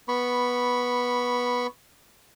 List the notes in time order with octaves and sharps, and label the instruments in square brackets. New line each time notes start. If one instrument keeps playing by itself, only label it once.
[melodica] B3 B5 C#6